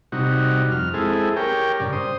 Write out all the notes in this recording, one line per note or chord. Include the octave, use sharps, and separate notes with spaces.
C3 G3 D#4 F#4
F2 F6
G#3 C4 E4 G#4 A4
G4 A#4 C#5 G5
G2 C#3 D5
C5 D#6